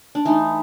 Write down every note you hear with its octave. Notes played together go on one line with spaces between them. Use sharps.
D4
E3 A3 D#4